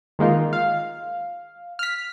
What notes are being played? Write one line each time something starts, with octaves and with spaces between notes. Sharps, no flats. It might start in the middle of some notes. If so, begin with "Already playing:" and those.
D#3 G#3 A#3 D#4 F4
F5
F6 B6